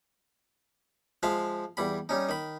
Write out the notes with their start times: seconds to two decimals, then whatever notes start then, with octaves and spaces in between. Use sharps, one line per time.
1.23 F3 G#3 E5 F5
1.77 E2 G3 B5
2.09 G3 C#4 D#4
2.29 D#3 B5